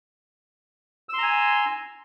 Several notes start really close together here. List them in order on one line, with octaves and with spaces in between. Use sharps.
E6 C6 A#5 G#5